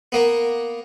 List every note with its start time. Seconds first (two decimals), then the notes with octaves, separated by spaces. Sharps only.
0.12 A#3 B3